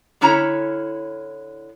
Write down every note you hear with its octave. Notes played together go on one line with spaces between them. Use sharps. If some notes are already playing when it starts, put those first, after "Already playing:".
D3 C#4 E4 C#5 A#5